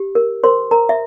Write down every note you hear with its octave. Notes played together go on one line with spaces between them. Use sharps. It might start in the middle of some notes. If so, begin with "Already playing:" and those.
Already playing: G4
A#4
A#4 C5 C6
A#4 A#5
E5